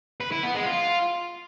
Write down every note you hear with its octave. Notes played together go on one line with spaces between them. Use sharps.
B4
E4
B3
G#3
F4